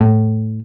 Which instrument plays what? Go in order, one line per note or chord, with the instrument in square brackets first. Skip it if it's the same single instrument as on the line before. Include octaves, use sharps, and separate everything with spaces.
[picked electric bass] A2